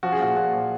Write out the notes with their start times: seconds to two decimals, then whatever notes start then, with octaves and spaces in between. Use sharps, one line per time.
0.03 F3 F#4
0.12 G#4
0.20 A#2 F#4
0.37 A#2 F#4
0.53 F3